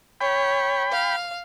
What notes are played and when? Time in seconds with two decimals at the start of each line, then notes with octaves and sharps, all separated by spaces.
0.21 C#5 G5 B5
0.92 F5